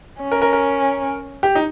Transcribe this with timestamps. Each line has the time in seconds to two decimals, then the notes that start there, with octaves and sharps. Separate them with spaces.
0.22 C#4
0.32 A#4
0.42 A#4
0.53 A#4
1.43 G4
1.55 D#4